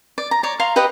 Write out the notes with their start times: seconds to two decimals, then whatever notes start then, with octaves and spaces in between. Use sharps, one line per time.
0.18 D5
0.31 A#5
0.43 C#5 D5
0.60 F5 A#5 C6 C#6
0.76 G4 B4 D#5 F#5